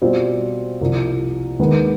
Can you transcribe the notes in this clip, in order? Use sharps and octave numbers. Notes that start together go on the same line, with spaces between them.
B2 G3 C4 F4
C2 C3 F3
D#2 D#3 G#3 B3